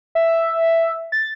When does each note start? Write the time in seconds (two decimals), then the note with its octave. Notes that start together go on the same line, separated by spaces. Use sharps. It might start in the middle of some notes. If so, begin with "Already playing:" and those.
0.15 E5
1.12 A6